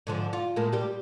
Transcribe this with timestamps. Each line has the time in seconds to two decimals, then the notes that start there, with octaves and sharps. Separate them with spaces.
0.07 G#2 D3 F3
0.33 F4
0.56 A2 G#3 A#3
0.73 G3 G4